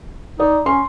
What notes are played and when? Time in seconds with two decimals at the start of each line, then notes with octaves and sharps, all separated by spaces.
0.40 D#4 D5
0.66 C#4 C6